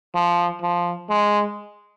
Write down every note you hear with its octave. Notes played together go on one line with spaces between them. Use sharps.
F3
F3
G#3